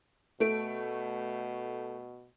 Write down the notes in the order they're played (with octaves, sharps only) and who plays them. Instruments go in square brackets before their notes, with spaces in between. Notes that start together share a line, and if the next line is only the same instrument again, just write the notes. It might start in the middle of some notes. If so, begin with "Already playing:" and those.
[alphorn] B2 [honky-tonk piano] A3 D7